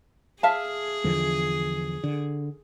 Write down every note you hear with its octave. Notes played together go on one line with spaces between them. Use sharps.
G#4 E5 F5 A5
E2 D3 F3
D3